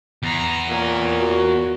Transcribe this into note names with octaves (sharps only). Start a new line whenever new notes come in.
E2 A#5
A#2 A#4 C#5
F#4